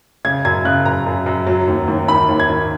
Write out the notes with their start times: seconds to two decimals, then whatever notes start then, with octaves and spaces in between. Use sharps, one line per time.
0.25 C#3 G#6
0.45 F#2 G#6
0.65 C#3 F#6
0.85 F#2 A#5
1.06 F#2
1.26 F#2
1.47 F#3
1.68 D#2
1.88 D#2
2.08 D#3 B5
2.29 D#2
2.40 G#6
2.49 D#3